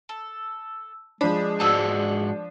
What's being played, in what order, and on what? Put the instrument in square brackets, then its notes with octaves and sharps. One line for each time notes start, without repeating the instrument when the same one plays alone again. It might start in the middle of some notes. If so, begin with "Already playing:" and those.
[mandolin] A4
[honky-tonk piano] F3 D4 [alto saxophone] G#3 [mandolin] B5
[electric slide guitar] G#2 F#4 A5 [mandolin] B3 E6